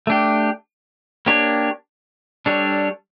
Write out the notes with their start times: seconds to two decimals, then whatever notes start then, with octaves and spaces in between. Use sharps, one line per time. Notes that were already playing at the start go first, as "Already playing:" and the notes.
0.07 A3 D4 G4
1.26 A#3 D4 G4 C#5
2.46 G3 D4 A4 C#5